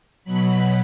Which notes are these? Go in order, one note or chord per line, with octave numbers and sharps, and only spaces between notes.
B2 F#3 B5